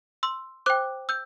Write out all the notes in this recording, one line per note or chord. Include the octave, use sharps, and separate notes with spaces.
C6 E6
C5 G5 D6 F#6
E6 G6